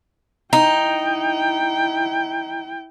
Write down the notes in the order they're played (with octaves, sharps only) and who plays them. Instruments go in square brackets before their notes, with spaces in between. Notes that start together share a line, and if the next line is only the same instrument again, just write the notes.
[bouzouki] D#4 [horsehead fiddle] E4 G5